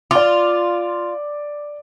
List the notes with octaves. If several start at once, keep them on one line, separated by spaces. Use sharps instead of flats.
F4 D5 D6